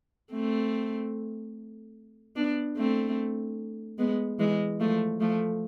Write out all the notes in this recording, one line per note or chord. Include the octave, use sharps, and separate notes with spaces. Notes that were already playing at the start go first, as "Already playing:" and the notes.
A3 C4
B3 D4
A3 C4
G#3 B3
E3 G#3
F3 A3
F3 A3